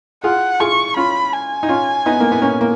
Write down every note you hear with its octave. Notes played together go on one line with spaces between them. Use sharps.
F4 G#4 F#5
F4 G#4 C#6
C#4 F4 B5
G#5
D#4
C#4 F4
B3 D#4
A#3
B3
A#3 C#4
A#3